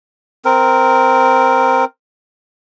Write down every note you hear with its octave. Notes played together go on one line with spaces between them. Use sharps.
C4 A#4